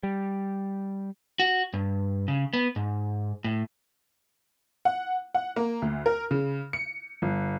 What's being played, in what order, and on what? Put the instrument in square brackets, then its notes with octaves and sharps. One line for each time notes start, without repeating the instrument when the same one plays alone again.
[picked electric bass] G3
[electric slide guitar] F#4
G2
C#3
B3
G#2
A2
[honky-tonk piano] F#5
F#5
A#3
D2
A#4
C#3
C#7
G1